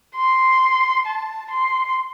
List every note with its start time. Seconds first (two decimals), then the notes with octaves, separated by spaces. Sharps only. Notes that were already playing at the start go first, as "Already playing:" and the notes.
0.16 C6
1.06 A5
1.51 C6